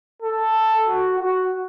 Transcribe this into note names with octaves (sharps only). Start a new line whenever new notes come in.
A4
F#4
F#4